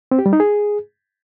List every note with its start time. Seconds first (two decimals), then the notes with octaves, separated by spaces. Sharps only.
0.11 C4
0.19 G4
0.26 G3
0.33 D#4
0.40 G#4